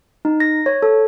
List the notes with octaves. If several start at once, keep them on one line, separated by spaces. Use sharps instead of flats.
D#4
A#6
C#5
A4